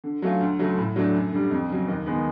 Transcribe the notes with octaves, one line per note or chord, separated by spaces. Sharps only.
D3
F#3 A3 C#4 F4
D2
C#3 F#3 A3
A2
F#3 A3 D4
F#2
D3 G3
F2
C#3 F#3
D#2
D#3 G#3 B3